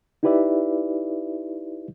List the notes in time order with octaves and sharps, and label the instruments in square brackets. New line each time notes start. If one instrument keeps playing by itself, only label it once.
[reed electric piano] D#4 E4 G4 B4 D5 E5